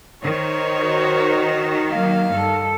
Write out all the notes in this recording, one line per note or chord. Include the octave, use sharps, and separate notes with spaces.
D#3 C5 C#5
F#4
F#3 A#3 F5
G2 A4